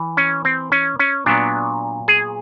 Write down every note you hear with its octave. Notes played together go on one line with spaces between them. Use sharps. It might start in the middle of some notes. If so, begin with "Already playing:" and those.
Already playing: E3
C#4
C4
C#4
C#4
A#2 F#3 B3 D4
G#4